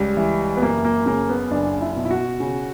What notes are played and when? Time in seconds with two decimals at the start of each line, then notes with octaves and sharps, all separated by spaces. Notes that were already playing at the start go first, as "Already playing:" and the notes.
Already playing: C#2 G3
0.17 E3
0.57 B3
0.62 F#1 A#3
0.85 A#3
1.06 C#3 A#3
1.29 B3
1.51 F#1 D4
1.81 E4
1.96 B2
2.05 E4
2.11 F#4
2.40 C#3